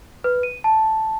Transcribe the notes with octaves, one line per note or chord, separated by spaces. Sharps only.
B4
D#7
A5